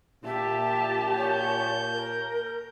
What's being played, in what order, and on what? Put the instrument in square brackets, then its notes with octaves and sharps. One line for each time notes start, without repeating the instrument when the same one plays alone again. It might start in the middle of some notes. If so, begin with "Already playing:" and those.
[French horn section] A#2 [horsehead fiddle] G4 A5 [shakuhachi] E5
[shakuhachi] C#5 [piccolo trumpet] G6
[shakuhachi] A#4